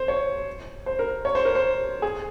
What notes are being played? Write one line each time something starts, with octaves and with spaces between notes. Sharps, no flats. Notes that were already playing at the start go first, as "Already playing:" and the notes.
Already playing: C5
C#5
C5
A#4
C#5
C5
A#4
C5
G#4